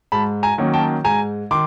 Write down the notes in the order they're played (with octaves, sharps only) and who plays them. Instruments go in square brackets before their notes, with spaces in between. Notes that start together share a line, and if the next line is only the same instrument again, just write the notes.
[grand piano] G#2 A5 B5
G#5 A#5
D#3 F#3 A#3 C#4
G5 A5
G#2 G#5 A#5
D#3 C6 D6